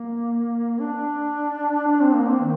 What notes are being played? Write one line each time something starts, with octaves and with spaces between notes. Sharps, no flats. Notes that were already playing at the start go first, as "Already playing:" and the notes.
Already playing: A#3
D4
D4
C4
A#3
C4
D#3